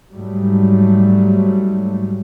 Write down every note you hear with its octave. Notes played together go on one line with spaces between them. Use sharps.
G#2 F#3 G3 A3